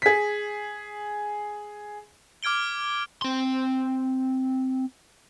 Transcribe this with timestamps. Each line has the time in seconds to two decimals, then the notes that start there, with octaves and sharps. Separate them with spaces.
0.02 G#4 B6
2.43 D6 F6 G#6 D7 G7
3.22 C4 C6